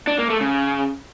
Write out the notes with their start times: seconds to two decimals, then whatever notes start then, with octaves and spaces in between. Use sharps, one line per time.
0.07 D4
0.19 A#3
0.30 A3
0.41 C#3